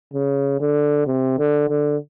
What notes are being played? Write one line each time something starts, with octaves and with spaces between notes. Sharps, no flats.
C#3
D3
C3
D3
D3